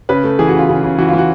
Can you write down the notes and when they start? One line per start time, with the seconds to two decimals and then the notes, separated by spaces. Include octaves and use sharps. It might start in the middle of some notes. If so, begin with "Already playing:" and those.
0.09 C#3 B4
0.24 A3
0.39 E3 G#4
0.49 F#4
0.54 C#3 F4
0.69 C#3
0.84 C#3
0.98 E3 F#4
1.08 F4
1.13 E3 F#4